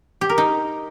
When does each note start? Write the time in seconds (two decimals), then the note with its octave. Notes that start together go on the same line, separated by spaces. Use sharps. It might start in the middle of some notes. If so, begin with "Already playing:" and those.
0.21 G4
0.29 A#4
0.38 D#4